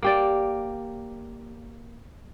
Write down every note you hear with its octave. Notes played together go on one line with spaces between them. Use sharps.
A#3 G4 D5